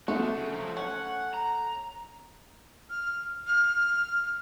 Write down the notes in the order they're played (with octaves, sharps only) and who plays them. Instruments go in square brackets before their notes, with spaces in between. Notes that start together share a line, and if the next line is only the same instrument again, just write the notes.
[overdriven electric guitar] G#3 D4 [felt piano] A3 [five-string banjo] F#4
[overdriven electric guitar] C#3
F3 F#3
[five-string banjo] C#4 [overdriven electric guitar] F#5
[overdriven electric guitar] A#5
[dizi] F6
F6